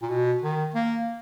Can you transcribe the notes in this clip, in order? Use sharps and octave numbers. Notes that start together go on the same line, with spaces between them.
A#2
B2
D#3
A#3